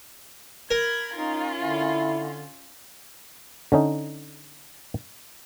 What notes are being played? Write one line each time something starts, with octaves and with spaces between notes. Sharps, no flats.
A#4 B5 G#6
C#4 D#4 F4
D3 E4
D3 C#4 D#4